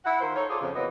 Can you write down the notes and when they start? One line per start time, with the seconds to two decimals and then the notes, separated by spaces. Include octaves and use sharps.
0.05 E4 F#5
0.21 D#3 F4 A#4 C5
0.36 D#4 A4 C#5
0.50 F4 G#4 A4 C5 D5
0.61 F2 C#3
0.76 E3 F#3 A#3 B3 D#5